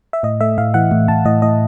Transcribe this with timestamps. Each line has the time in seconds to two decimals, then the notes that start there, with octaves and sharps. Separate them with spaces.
0.13 E5
0.23 A2 D#5
0.41 A3 E5
0.58 A2 F5
0.74 E3 F#5
0.91 A2
1.08 A2 A5
1.25 A2 D#5
1.42 A2 D#5